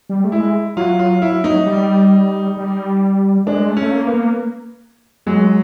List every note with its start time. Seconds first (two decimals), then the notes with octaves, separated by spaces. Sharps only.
0.09 G3
0.24 A3
0.32 G#3 E4
0.77 F#3 F4
0.99 F4
1.22 E4
1.44 D#4
1.66 G3
2.57 G3
3.47 G#3 D4
3.69 A3
3.77 C#4
3.82 A3
3.91 A#3
4.07 B3
4.14 A#3
5.26 F#3 G#3